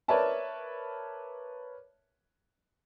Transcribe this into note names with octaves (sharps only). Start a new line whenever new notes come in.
A#4 B4 C#5 D5 E5 A5